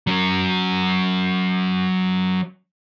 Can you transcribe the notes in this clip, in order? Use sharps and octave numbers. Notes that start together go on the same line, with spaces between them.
F#3 C#4